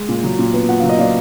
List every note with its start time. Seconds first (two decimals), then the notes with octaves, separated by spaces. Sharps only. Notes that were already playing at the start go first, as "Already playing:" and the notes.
Already playing: G#3
0.09 A#2
0.24 F#3
0.39 A#2
0.54 B3
0.69 A#2 F#5
0.79 F#3 F5
0.89 D#5
0.99 A#2 D5 F5